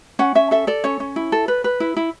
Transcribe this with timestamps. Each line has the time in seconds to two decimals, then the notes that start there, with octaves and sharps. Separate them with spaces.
0.19 C#4 F#5
0.35 C#4 E5
0.51 A4 E5
0.67 A4 D5
0.84 C#4 C#5
1.00 C#4
1.16 E4
1.32 A4
1.48 B4
1.64 B4
1.80 E4
1.97 E4